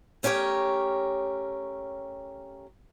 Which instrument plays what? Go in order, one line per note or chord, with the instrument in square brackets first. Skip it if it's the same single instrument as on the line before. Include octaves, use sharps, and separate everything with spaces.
[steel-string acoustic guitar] A3 C#4 G4 A#4 C#5